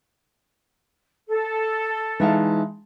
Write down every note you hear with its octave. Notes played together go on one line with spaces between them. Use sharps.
A4
E3 G#3 D#4 E5 F5 A5